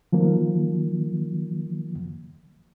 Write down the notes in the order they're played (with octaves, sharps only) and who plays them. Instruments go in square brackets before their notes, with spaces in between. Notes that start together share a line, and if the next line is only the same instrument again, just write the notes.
[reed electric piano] D#3 F3 F#3 A#3